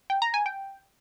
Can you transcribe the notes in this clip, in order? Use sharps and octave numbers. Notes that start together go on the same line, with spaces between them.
G5
A#5
G#5
G5